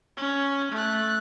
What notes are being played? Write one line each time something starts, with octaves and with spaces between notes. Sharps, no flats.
C#4
A3 F#6